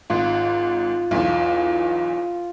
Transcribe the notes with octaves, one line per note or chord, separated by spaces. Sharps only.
G#1 G#2 F4
B1 E2 F4